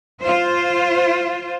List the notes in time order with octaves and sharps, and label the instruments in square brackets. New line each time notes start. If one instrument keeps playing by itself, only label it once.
[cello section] F4 C5